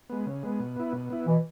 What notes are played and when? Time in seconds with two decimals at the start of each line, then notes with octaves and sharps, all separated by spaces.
0.09 G#3 B3
0.26 C#3
0.43 G#3 B3
0.60 B2
0.76 B3 E4
0.93 B2
1.10 B3 E4
1.26 B2 E3